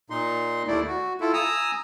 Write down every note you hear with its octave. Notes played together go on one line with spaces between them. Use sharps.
A#2 D#4 C6
D#2 A3 E4 D5
F#4
E4 F4 A4
G#5 A#5 D#6 E6